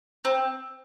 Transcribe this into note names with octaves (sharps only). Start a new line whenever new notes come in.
C4